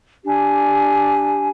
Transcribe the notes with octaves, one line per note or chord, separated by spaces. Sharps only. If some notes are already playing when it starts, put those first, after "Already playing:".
D4 G4 G#5